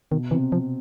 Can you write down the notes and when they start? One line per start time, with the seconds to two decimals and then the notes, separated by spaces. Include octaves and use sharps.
0.11 B2 D#3
0.31 C3 E3
0.52 F3